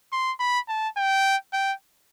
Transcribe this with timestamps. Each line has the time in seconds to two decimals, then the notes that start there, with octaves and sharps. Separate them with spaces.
0.12 C6
0.40 B5
0.69 A5
0.97 G5
1.53 G5